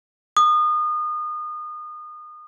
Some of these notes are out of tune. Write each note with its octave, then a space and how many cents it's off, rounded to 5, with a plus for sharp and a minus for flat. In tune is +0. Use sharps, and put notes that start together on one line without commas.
D#6 -30